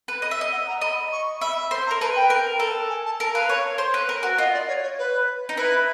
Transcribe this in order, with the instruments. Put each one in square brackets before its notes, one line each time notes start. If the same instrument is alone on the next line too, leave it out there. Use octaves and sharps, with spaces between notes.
[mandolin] B4
D#5
E5
D#5
[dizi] F#5
A#5
[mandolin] D#5 [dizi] B5
[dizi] C#6
[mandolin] E5 [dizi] B5
[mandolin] C5 [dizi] C6
[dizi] A#5
[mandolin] A#4
[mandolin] B4 [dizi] A5
[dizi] G5
[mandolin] A#4
A4
[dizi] G#5
A5
[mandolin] A#4 [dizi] A5
[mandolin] B4 [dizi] F5
[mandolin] C#5
C5
B4
A#4
F#4
[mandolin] F4 [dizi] D#5
[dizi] D5
C#5
C#5
B4
[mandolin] D#4
[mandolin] E4 [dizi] B4